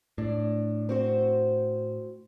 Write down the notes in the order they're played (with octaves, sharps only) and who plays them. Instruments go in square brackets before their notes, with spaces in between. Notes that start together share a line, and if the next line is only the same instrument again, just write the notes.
[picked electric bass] A2 [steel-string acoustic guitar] D4
[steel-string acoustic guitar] C4 F#4 C5